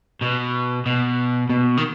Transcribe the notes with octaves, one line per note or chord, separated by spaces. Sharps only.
B2
B2
B2
D#3